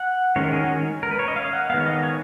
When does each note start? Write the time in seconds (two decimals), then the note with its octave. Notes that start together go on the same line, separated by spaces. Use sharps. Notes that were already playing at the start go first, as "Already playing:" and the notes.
Already playing: F#5
0.36 D#3 G#3 C#4 C#5
0.44 A#4
0.53 G#4
0.61 F#4
1.03 A#4
1.11 B4
1.19 C#5
1.28 D#5
1.36 F5
1.53 F#5
1.70 D#3 G#3 B3 F5
1.81 C#5
1.86 D#5
2.03 C#5